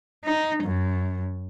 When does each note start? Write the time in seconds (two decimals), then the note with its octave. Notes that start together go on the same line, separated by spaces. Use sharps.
0.25 D#4
0.64 F#2